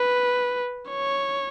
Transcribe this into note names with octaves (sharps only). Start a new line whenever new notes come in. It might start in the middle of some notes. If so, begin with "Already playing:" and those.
Already playing: B4
C#5